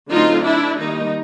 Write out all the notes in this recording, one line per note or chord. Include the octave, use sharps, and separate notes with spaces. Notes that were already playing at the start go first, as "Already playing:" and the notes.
D3 F#3 A3 C4 D#4 F4
D4 E4
D#3 G3 A#3 D#4